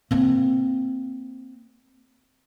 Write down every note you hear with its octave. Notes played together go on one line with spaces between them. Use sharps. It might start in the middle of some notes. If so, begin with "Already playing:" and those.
A#3 C4